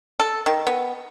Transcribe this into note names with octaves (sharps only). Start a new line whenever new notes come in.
A4
D#3
B3